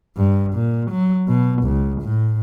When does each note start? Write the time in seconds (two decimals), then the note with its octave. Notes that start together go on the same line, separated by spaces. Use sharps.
0.17 G2
0.53 A#2
0.91 F#3
1.28 B2
1.63 C#2
2.02 A2